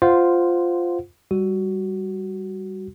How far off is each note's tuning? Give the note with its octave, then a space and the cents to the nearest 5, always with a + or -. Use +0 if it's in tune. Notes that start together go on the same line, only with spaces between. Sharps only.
F4 +0 C5 -10 F#5 +0
G3 +0 F#4 +15